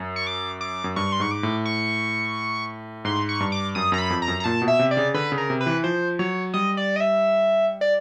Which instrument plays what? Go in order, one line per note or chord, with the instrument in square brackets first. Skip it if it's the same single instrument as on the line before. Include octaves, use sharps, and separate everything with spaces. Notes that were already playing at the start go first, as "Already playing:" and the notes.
Already playing: [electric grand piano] F#2
[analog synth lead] C#6
D6
D6
[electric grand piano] F#2
[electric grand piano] G2 [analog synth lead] C#6
[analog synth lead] C6
[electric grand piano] G#2 [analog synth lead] C#6
[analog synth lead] D6
[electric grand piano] A2
[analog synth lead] C#6
[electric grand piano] G#2 [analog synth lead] C6
[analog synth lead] C#6
[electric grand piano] G2
[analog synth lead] D6
[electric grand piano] F#2 [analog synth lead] D#6
[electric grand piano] F#2 [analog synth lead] A#5
[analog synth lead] B5
[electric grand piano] F2
[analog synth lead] A#5
[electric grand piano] F#2
[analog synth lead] A#5
[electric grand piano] A#2 [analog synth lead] A5
[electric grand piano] B2
[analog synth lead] E5
[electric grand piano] C3
[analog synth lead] D5
[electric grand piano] C#3
[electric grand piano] D3 [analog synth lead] B4
[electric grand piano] C#3
[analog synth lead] A#4
[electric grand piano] C3
[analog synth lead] B4
[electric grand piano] E3
[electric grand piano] F3 [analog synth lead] C5
[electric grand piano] F#3 [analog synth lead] C#5
[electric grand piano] G3 [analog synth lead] D#5
[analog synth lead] D5
D#5
E5
D5